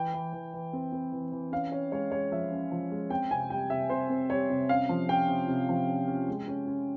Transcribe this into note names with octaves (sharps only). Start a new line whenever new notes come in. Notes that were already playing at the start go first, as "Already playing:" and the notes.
Already playing: E3 G5
E3
E3
E3
C4
C4
E3
E3
C#4 F5
C#4 C#5
G#3 C#5
G#3 C#5
F3 E5
C#4
F3
G#3
C4 G5
C3 G#5
G3 G5
C3 E5
C3 C5
C4
G3 C#5
C3
C#4 F5
F3
C#4 G5
C3
C3
F3
C#4
C#4
G#3
C#4
C#4